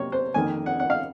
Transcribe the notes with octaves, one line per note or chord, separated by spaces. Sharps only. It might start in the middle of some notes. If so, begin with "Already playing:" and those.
Already playing: C3 F#3 A#3 C#5
C5
F2 D#3 A#3 G#5
F#5
F#5
F5